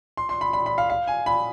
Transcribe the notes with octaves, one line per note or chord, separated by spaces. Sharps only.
C6
C6
B5
B5
B5
F5
F5
G#5
B5